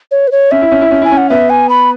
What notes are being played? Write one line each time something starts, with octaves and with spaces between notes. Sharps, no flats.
C#5
B4
C#5
C#4 E5
E4
C#4
E4
C#4
E4 G#5
C#4
F#5
B3 E5
G#5
B5